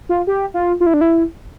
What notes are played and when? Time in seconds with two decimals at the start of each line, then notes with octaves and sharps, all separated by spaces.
0.09 F4
0.27 G4
0.54 F4
0.80 F4
0.86 E4
0.94 D4
1.01 E4